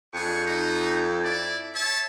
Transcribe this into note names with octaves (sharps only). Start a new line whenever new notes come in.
F2 D4 G#4 C#6
D#4
E4 D5
C#5 E5 A5